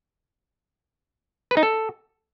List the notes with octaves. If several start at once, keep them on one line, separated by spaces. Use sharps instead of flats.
B4
D#4
A4